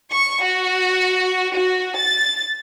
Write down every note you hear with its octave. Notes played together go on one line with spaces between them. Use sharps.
C#6
F#4
F#4
A6